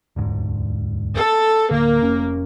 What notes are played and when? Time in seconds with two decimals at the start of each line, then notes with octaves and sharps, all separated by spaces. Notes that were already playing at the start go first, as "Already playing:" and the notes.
0.16 E1 D2 G#2
1.14 A4
1.71 D1 D3 A#3
2.03 F1 C#4